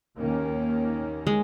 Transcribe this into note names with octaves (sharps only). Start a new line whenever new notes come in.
D#2 D#3 A#3 C#4
G#3